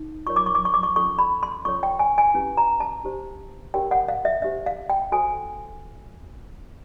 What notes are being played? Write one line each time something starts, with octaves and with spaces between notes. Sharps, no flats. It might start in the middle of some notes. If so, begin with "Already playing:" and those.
Already playing: D#4
F4 A#4 C#5 C#6
D6
C#6
D6
C#6
D6
C#6
C#4 F4 A4 C#6
B5
C6
C#4 F4 A4 C#5 C#6
G5
G#5
G#5
C#4 E4 G4 B4
A#5
A5
D4 G4 C5
D4 G4 A#4 C#5 G5
F#5
F5
E5
D4 G4 C5 E5
F5
G5
F#4 A4 C5 G#5